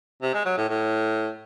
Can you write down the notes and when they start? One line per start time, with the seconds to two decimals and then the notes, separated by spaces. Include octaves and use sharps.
0.22 C3
0.34 G#3
0.45 F#3
0.57 A2
0.69 A2